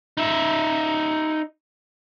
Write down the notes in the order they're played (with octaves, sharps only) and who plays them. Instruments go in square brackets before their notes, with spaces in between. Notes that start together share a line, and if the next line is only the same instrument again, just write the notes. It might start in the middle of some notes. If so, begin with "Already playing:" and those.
[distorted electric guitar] D#4 E5